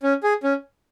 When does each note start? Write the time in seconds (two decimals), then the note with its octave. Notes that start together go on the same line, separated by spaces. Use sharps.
0.03 C#4
0.23 G#4
0.44 C#4